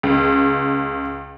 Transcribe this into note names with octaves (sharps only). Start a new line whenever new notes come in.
C#2